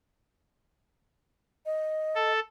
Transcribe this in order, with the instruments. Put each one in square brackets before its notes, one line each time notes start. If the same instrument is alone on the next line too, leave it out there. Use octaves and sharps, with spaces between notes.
[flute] D#5
[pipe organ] A4